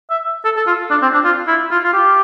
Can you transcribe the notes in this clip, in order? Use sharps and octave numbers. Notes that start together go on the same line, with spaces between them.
E5
A4
A4
F4
D4
C4
D4
F4
E4
F4
F4
G4